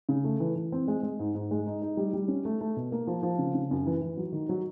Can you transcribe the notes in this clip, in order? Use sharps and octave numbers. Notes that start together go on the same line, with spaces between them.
C#3
A3
E3
E3
C4
G#3
G#3
G#2
G#2
G#3
D#4
D#4
G3
G3
C#4
A3
A3
B2
A#3
F3
F3
C#3
C#3
F#2
E3
E3
F#3
D#3
F#3